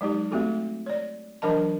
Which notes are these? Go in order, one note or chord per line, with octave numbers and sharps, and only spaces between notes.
F#3 G#3 D#4 G4
A3 A#3 C4 F#4 G4 A4
C#5 D5
E3 F#3 D4 A#4 D#5 A5